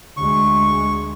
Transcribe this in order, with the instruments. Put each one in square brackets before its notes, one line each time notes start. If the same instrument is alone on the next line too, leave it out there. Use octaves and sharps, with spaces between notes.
[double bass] D2 G#3 [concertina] C#6